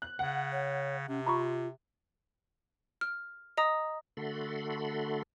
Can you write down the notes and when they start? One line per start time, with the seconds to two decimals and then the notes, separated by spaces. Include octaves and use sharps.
0.02 F#6
0.19 C#3 F#5
0.52 C#5
1.08 C3 C#4
1.27 F4 A#5 B5 C#6
3.01 F6
3.57 D#5 A#5 D#6
4.17 D3 A3 F#4 A4 B5 C6